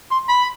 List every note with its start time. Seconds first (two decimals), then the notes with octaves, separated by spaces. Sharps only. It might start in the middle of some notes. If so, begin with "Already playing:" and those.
0.12 C6
0.29 B5